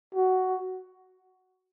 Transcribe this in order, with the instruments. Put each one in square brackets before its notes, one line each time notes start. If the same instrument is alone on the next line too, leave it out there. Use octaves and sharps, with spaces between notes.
[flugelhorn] F#4